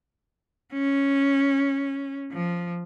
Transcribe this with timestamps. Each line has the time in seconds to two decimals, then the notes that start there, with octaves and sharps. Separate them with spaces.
0.73 C#4
2.32 F3